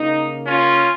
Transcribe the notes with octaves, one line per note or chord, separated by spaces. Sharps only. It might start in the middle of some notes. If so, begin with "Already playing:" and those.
Already playing: C#3 A#3 D#4
C#4 F4